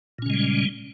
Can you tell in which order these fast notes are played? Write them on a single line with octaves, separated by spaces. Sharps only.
A#2 C#4 C#3 G#3 G3